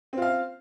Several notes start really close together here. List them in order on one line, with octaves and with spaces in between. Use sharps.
C4 F4 F5